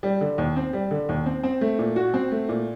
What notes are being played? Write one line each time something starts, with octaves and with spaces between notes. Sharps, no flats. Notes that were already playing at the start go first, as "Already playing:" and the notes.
G3
D3
D#2
C4
G3
D3
D#2
C4
C4
A3
A#2
F#4
C4
A3
A#2